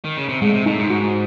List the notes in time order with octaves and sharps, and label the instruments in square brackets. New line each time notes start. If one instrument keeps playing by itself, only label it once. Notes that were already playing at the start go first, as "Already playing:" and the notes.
[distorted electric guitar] D#3
C#3
C3
[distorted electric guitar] A2 [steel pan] G#3
[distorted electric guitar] C3
[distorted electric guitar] A2 [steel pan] D#4
[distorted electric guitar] G#2
[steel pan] F#4